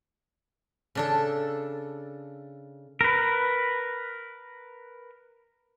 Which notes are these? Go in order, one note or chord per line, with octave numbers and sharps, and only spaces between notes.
C#3 D4 A4
A#4 B4